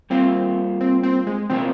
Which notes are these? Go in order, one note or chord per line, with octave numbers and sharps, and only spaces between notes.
G3 A#3 C4 F4
C4
C4
G#3
C3 F3 A#3 C4